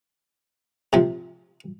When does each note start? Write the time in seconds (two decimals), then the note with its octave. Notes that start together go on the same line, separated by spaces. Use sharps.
0.93 C3 F3